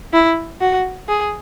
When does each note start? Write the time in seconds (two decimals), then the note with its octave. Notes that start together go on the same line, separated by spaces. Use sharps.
0.13 E4
0.61 F#4
1.08 G#4